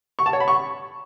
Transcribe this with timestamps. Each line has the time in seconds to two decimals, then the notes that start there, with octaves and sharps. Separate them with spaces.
0.19 C#6
0.26 A5
0.33 C#5
0.40 B5
0.48 C#6